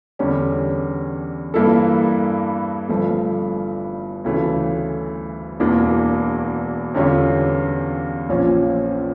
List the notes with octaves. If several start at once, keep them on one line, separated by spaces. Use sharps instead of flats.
E2 D3 G3 C#4
G2 E3 A#3 E4 A4
G1 G2 F3 A3
D2 C#3 E3 A3
E1 E2 E3 A#3 D4
E2 D3 G3 C#4 F4
A#1 A#2 F3 C#4